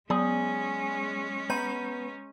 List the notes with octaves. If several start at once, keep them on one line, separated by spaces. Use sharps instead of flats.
F#3 G#3 B3 C#4 G#4 D5
B3 A#5 G6 D#7